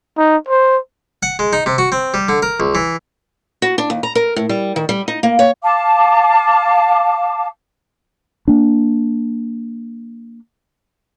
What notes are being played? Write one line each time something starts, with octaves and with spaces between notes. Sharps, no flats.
D#4
C5
F#5
G#3
D#4
C3
F#4
C4
G3
D3
A#4
C#2
E3
F#4
D4
D#2
A#5
A#4
A2
G3
D#3
G3
D#4
A#3
C#5
F5 A5 D6
A#3 D4